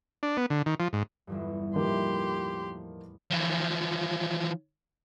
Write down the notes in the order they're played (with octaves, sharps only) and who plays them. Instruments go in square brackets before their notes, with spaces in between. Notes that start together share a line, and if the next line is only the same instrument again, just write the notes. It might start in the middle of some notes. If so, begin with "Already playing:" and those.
[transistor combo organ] D4
B3
D3
D#3
F3
G#2
[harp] G1 E2 G2
[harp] A2 B5 [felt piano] F3 A#3 D#4 [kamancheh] G4 C6
[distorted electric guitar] E3 F3